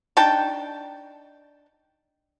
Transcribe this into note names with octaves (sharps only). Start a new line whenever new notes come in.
D4 D#4 G5 A5